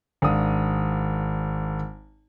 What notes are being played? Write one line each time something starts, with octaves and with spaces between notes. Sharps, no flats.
G#1 D4 F5 D#6